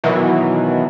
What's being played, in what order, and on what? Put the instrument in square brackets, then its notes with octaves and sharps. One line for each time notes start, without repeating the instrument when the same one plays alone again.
[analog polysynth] B2 D#3 E3 F#3